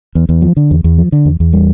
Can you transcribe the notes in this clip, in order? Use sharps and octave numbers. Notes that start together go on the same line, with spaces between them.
E2
E2
F3
D3
E2
E2
F3
D3
E2
E2
G3